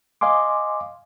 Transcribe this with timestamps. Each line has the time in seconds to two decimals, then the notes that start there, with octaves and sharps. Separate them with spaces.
0.21 D#5 F5 G#5 C6 D6